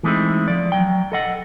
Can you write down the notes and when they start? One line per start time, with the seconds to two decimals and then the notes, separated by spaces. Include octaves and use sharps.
0.03 E3 G#3 A3 C4 D#4 E4
0.48 F3 D5
0.72 F#3 G5
1.12 A4 D#5 F#5